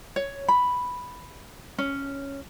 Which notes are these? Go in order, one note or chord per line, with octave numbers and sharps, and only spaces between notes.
C#5
B5
C#4